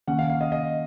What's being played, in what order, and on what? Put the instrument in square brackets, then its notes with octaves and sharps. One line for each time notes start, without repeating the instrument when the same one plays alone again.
[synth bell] D#3 A#3 C#4 [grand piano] F#5
[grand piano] F5
F5
D#5
D#5